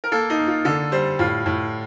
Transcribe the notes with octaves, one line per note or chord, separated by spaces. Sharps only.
A#4
A#3 A4
D#4
A#3
F4
D3 A4
G3 C5
A2 F4
A2